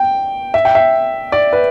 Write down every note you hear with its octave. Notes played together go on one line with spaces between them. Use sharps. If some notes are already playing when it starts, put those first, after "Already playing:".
Already playing: G5
E5
G5
E5
D5
B4